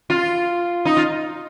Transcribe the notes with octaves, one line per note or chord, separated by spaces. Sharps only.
F4
D#4
F4